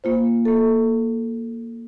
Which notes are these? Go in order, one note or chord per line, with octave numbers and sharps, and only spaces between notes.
A#3 F4 C5
A#3 A4